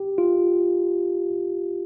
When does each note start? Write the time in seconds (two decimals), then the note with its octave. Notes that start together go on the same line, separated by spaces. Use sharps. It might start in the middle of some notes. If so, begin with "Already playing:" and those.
Already playing: G4
0.18 F4